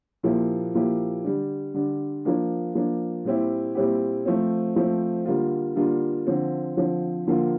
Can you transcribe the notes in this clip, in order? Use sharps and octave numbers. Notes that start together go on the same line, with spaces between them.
A#2 F3 A#3 E4 G4
A#2 F3 A#3 E4 G4
D3 G3 D4
D3 G3 D4
F3 A#3 D4
F3 A#3 D4
A#2 G3 C4 E4 G4
A#2 G3 C4 E4 G4
F3 A3 C4
F3 A3 C4
D3 G3 A#3 D4 F4
D3 G3 A#3 D4 F4
D3 F3 C4
D3 F3 C4
D3 F3 A#3 F4